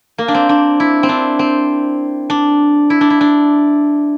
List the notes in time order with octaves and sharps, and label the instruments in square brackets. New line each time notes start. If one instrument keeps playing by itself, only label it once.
[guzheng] A#3
D4
C4
D4
E4
C4
D4
C4
D4
E4
D4
E4
D4